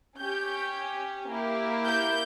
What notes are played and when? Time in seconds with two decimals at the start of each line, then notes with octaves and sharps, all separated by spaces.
0.18 C#4 G4 G6
1.29 A#3 E4 G4
1.85 G6